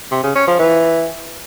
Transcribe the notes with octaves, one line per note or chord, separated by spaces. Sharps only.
C3
C#3
C#4
F3
E3